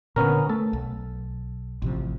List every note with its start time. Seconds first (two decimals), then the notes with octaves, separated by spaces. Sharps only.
0.16 A#2 D3 B3 C#4 A#4
0.50 A3 A4
0.73 B1
1.82 A1 C3 F3